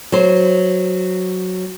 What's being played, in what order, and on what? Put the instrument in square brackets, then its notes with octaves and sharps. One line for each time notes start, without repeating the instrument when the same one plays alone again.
[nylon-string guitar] F#3 C5